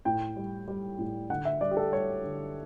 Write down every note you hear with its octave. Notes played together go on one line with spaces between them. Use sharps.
A2 G5
G3
G3
A2
D3 F#5
E5
G3 D5
G4
A4
G3 C#5
D3